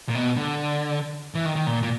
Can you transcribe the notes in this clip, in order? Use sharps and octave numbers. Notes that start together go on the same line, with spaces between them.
A#2
B2
D3
E3
D#3
D#3
A#2
A#2